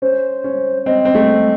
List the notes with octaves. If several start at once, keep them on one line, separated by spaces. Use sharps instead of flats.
C#4 C5
C#4
C4 D#5
C4
A3